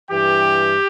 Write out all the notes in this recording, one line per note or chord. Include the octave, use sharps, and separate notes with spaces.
G2 E3 G4